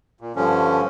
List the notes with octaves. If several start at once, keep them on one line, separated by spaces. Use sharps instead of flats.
A#2
G2 D3 F3 C#4